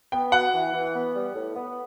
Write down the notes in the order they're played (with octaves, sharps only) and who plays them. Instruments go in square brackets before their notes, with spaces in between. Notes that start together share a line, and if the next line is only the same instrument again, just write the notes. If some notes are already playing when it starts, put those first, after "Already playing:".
[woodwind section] B3 [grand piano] G5
[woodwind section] F#4 [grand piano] F#5
[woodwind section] E3
E3
B3
G3
A2
B3